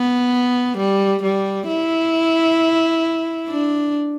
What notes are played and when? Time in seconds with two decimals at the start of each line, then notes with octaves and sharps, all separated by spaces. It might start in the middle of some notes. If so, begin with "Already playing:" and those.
Already playing: B3
0.78 G3
1.23 G3
1.68 E4
3.48 D4